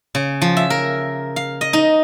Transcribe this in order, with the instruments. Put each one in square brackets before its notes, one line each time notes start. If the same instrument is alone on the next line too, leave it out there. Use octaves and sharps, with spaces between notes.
[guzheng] C#3
F3
E5
A#4
F5
D#5
D#4